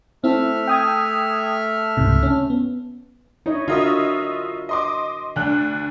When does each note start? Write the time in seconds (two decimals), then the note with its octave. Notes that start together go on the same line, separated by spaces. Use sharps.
0.24 A3 C4 E4 E5 F6
0.67 G5 D#6 G#6
1.97 C#2 G#2 C3
2.23 C#4
2.50 B3
3.46 D#4 E4 C#5 D#5
3.68 D3 F4 F#4 A#4 D#5 E5
4.69 D#5 C6 D6
5.36 D2 D4 F#6